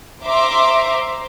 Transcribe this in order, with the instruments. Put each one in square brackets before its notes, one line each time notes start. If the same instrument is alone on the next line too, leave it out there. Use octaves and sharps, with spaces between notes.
[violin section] C5 E5 A#5 C6 D6